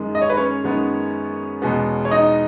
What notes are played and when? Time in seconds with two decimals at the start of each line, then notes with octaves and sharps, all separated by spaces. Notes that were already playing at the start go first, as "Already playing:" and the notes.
Already playing: F#2 D#3 G#3
0.15 D#5
0.22 C#5
0.30 B4
0.37 C#4 C#5
0.64 F#2 D#3 G#3 B3
1.62 E2 B2 G#3 B3
2.05 C#5
2.11 D#4 D#5